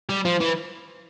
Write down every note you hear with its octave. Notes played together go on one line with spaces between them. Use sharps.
G3
F3
E3